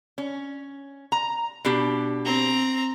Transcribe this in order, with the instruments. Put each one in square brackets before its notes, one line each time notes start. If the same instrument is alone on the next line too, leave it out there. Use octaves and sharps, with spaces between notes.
[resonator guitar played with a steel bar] C#4
A#5
B2 D4 G4
[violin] C4 A#5